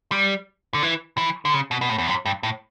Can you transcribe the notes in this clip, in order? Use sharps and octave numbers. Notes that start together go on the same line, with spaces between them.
G3
D3
E3
E3
D3
C#3
B2
B2
A2
E2
F#2
G2
A2